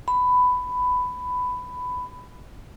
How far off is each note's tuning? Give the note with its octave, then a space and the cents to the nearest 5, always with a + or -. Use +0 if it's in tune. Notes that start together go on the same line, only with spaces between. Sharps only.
B5 +15